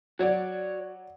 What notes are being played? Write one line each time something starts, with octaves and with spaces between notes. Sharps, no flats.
F#3 F#4 C#5 D5